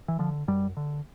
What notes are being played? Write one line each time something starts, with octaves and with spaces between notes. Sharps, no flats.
E3
D3 F3
F#2 G3
D3